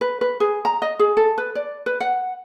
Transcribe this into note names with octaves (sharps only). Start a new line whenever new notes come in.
B4
B4
G#4
A#5
D#5
G#4
A4
B4
D5
B4
F#5